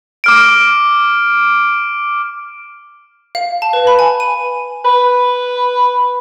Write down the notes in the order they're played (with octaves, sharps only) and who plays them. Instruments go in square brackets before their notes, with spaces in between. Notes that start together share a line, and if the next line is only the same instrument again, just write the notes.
[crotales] D6 F6 D7
[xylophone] F5
A5
B4
B5
G#5
D#7
[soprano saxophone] B4